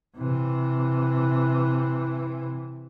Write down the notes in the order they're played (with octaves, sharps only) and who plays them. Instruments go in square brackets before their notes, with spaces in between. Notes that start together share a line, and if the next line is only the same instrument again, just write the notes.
[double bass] C3 E3